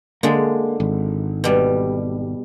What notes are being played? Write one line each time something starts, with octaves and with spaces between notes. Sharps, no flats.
D3 G#3 A#3
G#1
B2 G3